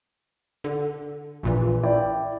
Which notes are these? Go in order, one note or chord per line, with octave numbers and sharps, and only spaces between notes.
D3
A#1 A#2 E3
E4 D5 G5